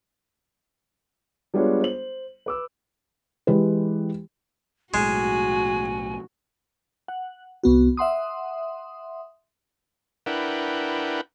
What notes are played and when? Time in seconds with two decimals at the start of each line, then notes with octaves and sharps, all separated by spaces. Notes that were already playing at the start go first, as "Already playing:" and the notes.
1.54 G3 G#3 B3 D4 F4 C#5
1.81 C5 F#7
2.46 B4 D6 E6
3.47 E3 G#3 E4 G4 B4
4.94 B1 A2 G#3 F#4 G#5
7.08 F#5
7.63 C2 B3 F#4
7.97 E5 F#5 C6 D#6
10.26 D4 E4 A#4 B4 F#5 G5